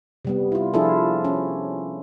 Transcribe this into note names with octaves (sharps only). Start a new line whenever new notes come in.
C3 G3 B3
E4 F4
F3 D4 E4 F4 G#4 A4
C#4